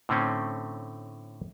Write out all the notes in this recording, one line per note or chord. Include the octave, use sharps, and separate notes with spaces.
A2 D3 A3 C4 C#4